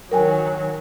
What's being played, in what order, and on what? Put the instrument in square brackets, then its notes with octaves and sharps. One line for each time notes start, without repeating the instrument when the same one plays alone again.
[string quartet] D#3 F#3 [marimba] A#4 G5 G#5